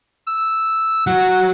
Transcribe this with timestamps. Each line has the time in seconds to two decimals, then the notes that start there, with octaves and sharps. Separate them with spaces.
0.28 E6
1.07 F#3 F#5